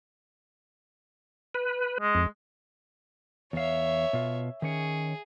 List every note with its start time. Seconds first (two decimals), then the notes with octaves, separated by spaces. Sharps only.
1.55 B4
2.00 G#3
2.15 F2
3.53 E2 C#5 E5 F5
4.13 B2 F4
4.62 D#3 C#4 G#4 C#5